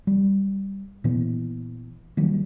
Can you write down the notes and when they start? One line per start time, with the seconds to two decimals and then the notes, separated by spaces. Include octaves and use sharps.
0.07 G3
1.04 A#2 E3 B3
2.17 D#3 F#3 G3 A#3